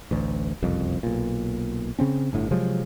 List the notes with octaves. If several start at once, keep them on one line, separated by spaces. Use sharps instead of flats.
A1 D2
F#1 C2 F2
B1 A#2
C#3 C4 C#4
G1 A2 D3
C3 F3 F#3 G#3